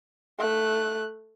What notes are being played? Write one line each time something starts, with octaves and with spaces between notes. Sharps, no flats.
A3 F#6